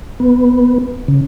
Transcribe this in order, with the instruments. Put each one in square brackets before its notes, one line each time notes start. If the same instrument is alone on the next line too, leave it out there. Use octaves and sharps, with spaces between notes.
[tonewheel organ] B3
C#3